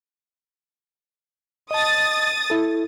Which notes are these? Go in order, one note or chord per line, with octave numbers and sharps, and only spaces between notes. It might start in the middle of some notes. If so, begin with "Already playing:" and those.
D#5 A5 D#6 A6
E4 A4